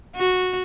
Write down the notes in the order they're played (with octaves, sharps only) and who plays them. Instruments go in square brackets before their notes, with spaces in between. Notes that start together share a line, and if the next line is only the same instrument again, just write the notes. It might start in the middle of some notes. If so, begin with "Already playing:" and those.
[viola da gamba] F#4